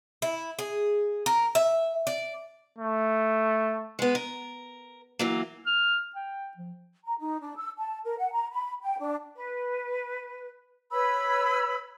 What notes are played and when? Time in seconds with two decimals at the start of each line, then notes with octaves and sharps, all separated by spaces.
0.22 E4
0.59 G#4
1.26 A#4
1.55 E5
2.07 D5
2.78 A3
3.99 G#3 B3
4.15 A#4
5.19 E3 F#3 A#3
5.66 F6
6.15 G5
6.57 F3
7.05 A#5
7.19 D#4
7.40 D4
7.57 E6
7.77 A5
8.04 A#4
8.18 F#5
8.32 A#5
8.51 B5
8.81 G5
8.99 D4
9.35 B4
10.91 B4 C#5 B5 E6